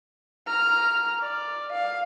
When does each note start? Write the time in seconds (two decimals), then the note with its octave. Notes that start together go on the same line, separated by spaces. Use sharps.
0.47 A#5 F6
1.20 D5
1.72 F5